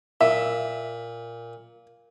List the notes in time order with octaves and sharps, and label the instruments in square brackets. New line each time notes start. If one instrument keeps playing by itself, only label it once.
[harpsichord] A#2 [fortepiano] E5